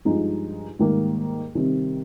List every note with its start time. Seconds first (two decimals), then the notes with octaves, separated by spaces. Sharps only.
0.05 G2 F3 G#3 D#4
0.79 G#2 D#3 G3 A#3
1.55 C3 D#3 G3 C4 G4